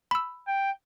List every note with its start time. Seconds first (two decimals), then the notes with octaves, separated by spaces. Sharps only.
0.11 B5 E6
0.48 G5